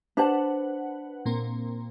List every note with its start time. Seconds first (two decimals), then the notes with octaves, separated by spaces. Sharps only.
0.17 D4 B4 C5 F#5 A5
1.25 A#2 A#3 C4